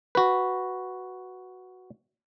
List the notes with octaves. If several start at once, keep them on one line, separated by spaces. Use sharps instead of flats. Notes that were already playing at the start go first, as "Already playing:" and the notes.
F#4 B4